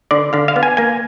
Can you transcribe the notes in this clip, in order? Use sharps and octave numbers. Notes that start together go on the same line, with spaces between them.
D3 D5
D3 F5
F5
B3
G#5
A#3 G#5